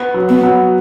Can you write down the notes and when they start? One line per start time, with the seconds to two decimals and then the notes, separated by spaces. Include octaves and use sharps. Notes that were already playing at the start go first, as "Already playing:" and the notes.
Already playing: B3
0.14 F#3
0.29 B3
0.43 F#3